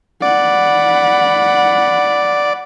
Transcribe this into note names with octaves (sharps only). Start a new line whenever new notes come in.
D5 F#5 B5